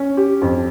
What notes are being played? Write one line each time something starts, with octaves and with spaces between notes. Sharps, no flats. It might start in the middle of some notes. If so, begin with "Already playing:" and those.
Already playing: C#4
G4
F2